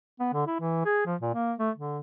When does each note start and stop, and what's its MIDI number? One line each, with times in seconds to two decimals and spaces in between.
0.20 0.29 59
0.33 0.44 50
0.47 0.56 64
0.60 0.81 52
0.86 1.02 68
1.06 1.15 53
1.21 1.33 46
1.34 1.54 58
1.59 1.70 57
1.78 2.00 50